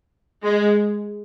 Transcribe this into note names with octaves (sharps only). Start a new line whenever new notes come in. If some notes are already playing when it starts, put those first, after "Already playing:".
G#3